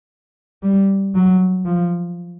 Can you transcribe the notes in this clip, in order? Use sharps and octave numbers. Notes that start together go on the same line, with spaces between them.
G3
F#3
F3